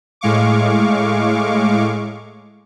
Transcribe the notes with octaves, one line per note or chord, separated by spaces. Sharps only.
A2 G#3 F5 C#6 D6